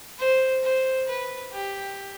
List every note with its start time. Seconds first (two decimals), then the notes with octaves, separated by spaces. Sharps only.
0.19 C5
0.64 C5
1.08 B4
1.52 G4